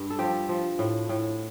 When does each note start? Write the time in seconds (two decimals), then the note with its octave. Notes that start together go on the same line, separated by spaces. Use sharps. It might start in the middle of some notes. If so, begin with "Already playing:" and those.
Already playing: G2
0.10 A4
0.19 F3 G4
0.49 F3
0.79 A2
1.09 A2